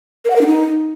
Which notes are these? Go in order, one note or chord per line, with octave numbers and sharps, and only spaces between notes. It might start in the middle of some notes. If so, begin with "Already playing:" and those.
A#4
F#5
A#4
D4
D#4